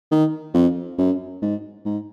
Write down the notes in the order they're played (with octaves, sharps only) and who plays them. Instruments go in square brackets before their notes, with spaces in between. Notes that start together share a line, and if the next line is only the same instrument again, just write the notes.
[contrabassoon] D#3
F2
F#2
G#2
G#2